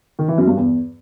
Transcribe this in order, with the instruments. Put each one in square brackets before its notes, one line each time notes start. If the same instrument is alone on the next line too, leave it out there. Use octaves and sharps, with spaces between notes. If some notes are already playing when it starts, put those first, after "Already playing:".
[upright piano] D#3
E3
F#2
G2
E2